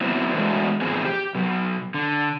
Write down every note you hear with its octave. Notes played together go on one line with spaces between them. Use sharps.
F#3 B3 C4 E4
E3 G#3 A3 B3 D4 F#4
A2 E3 F3 B3 C4 G#4
G4
B2 F#3
D3